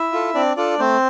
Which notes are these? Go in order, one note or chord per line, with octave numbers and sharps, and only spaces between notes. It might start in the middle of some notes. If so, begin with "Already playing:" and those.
Already playing: E4 E5
F4 A4
C4 D4 D5
D4 F4 A4 D5
A3 C4 C5